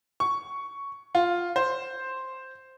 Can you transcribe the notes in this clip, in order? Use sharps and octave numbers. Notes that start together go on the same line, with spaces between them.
C#6
F4
C5